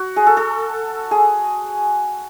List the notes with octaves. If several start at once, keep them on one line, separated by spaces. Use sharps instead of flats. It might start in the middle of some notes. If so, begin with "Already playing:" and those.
Already playing: F#4
G#4
A4
A4
G#4